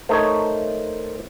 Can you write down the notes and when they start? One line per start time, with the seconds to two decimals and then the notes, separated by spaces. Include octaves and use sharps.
0.09 A3 D#4 A#4 C5 C#5